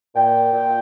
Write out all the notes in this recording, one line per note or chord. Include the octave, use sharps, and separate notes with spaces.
A#2 G5
A#2